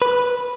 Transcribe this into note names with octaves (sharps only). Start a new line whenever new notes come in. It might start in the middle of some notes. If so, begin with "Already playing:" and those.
B4